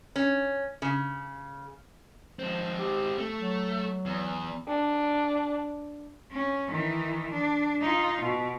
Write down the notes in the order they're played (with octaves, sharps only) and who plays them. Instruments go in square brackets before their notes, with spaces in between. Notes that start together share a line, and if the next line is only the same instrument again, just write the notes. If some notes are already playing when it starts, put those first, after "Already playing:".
[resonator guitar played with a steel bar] C#4
C#3
[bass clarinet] F3 [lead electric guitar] G#3 C4
[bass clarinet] G4
[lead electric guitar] A3
[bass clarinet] F#3
[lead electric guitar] E2
[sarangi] D4
[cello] C#4
D#3 E3
D4
D#4 F4
B2